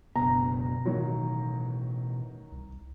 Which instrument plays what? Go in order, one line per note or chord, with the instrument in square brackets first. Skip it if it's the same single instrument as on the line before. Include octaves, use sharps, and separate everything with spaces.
[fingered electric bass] F#1 D2 B3 [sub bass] B2 [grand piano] A#5
[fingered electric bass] A2 E3 [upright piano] D#3 F#3
[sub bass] C2